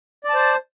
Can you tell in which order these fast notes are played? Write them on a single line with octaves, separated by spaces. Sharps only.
D5 A5 C5